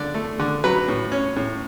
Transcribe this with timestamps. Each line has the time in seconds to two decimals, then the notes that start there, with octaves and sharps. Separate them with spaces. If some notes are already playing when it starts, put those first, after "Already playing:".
Already playing: D3 D4 D5
0.14 A3
0.40 D3
0.64 F#3 B4
0.88 A2
1.12 C#4
1.36 A2